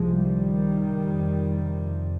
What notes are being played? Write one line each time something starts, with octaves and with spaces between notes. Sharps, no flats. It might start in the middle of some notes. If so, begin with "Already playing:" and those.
Already playing: C2 C3 F3 G#3
D#3 G3
F2 C3